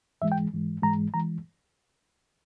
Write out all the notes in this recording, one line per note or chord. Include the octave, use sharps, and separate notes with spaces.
G#2 E3 G#3 E5
G5
G#2 E3 G#3
G#2 E3 G#3 A#5
E3 G#3 A#5